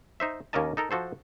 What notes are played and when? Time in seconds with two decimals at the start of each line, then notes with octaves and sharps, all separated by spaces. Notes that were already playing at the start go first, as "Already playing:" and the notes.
0.20 D#4 C5 E5
0.53 D#2 A#3 C#4 A#4 D#5 A5
0.77 D#4 A4 A#4
0.91 F3 F#4 A4 C5